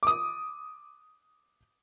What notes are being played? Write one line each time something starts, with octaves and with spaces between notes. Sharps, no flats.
D6 D#6